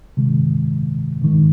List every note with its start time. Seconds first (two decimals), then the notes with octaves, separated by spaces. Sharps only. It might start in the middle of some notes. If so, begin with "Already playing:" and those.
0.17 C3 D#3 G#3
1.22 G#2 D#3 G#3